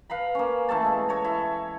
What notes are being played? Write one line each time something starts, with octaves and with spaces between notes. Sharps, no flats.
B4 F5 A#5 B5
A#3 C#4
E3 A3 A4 A5
G#3 E4
A4 C#5 A#5
E4